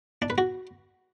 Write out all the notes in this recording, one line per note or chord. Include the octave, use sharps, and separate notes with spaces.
D4
B4
F#4